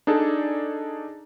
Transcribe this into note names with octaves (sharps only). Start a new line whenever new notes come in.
D4 D#4 G#4 A4 D5